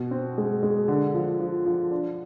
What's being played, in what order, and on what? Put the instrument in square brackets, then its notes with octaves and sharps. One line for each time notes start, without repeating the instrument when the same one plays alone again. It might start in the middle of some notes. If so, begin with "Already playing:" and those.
Already playing: [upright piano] B2
C4
G#3
G#3
D3
F3
F3
F3
D4